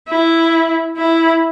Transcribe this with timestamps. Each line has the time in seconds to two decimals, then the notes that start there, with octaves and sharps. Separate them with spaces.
0.08 E4
0.97 E4